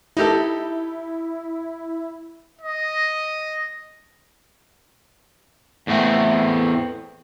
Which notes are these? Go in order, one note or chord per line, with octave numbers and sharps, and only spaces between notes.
D#4 E4 G4 A4
D#5
E2 A2 A3 B3 C4